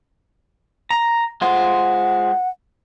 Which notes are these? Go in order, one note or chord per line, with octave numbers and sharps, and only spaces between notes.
A#5
G#3 F4 C5 F#5